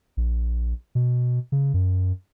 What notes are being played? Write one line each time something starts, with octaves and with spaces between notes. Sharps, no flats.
A#1
B2
C#3
F#2